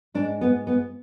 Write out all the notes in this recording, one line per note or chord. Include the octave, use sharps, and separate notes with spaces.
G#2 D4
B3
B3